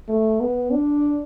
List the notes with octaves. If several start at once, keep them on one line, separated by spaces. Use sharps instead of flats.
A3
B3
D4